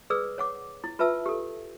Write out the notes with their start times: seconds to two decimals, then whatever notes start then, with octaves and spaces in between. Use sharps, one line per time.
0.10 G#4 B4 D5 D#6 E6
0.38 C#5 F#5 D6
0.84 E4
0.99 F4 B4 E5 A5 E6
1.26 G4 A4